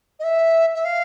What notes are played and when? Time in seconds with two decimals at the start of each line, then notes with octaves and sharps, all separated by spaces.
0.20 D#5
0.24 E5
0.74 E5
0.85 F5